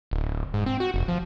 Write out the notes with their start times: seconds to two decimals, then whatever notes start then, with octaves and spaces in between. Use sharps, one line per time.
0.11 D1
0.54 G#2
0.66 C4
0.80 F#4
0.94 F1
1.08 F3